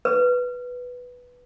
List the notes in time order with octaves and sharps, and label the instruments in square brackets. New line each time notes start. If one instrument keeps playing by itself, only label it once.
[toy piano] B4